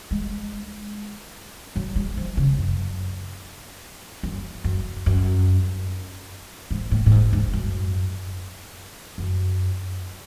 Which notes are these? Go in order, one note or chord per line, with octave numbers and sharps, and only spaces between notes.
G#3
F#3
G#3
F3
C#3
F#2
F#2
F#2
F#2
G#2
A2
A2
G#2
G#2
F#2
F#2